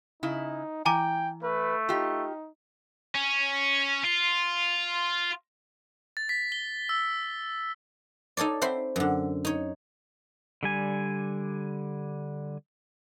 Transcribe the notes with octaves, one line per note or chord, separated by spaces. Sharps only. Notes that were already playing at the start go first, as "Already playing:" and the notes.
C#3 D#4 E4
E3 G5 G#5 A#5 D6
A3 B4
D#4 F4 G4
C#4
F4
A6
B6
G7
E6
D#4 A4 C#5 D5
C4 C5 E5 B5 C6
F#2 D3
D#4 C#5
D3 G3 G#5